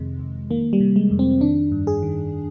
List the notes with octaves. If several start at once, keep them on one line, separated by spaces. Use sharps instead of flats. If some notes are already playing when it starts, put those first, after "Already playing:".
Already playing: F2 C3 D#3 G#3
F2
D#3 A#3
G3
C3
G#3
F2
C4
D#3 D4
G2
G#4
D#3